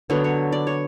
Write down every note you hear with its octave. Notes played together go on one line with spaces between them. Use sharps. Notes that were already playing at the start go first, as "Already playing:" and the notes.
D3 F#3 B3 C#5
C#5
D5
C#5